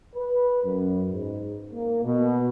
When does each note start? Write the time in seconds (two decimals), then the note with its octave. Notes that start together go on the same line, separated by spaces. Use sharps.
0.15 B4
0.63 F#2
1.10 G#2
1.72 A#3
2.03 B2